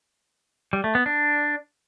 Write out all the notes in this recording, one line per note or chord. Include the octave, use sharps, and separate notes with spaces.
G3
A3
B3
D4